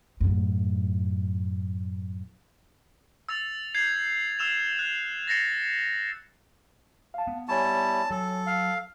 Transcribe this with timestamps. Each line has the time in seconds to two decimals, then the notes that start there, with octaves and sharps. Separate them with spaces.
0.20 F#2 A2
3.29 E6 A6 F7
3.75 G6 G#6 C7
4.39 E6 F6 E7 F7
4.79 F#6
5.28 A6 A#6 C7 C#7
7.14 F5 A5
7.27 B3
7.49 G3 E4 C#5 G#5 A5 C#6
8.11 F#3 A4
8.47 F5